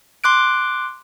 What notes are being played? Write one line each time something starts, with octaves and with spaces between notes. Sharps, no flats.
C6 D6 F#6 D7